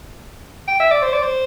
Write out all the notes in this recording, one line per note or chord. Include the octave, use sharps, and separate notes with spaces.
G5
E5
D5
C5
D5
C5